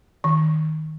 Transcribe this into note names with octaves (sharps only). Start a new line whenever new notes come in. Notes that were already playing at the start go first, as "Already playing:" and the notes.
D#3